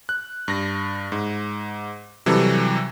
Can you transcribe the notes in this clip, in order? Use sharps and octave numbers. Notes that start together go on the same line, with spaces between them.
F#6
G2 A#6
G#2
C3 E3 F#3 G3 A4